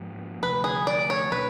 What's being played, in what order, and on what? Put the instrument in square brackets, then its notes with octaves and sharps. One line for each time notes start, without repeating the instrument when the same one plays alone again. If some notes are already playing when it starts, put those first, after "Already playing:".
Already playing: [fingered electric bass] G#2 F3 A#3
[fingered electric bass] D2 C3 F3 [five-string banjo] B4
[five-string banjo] G#4
D5
C#5
[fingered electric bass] B2 F#3 A#3 D4 [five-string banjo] B4